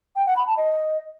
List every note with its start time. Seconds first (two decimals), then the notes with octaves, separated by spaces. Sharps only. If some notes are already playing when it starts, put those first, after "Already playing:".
0.16 G5
0.26 F#5
0.36 B5
0.47 A5
0.57 D#5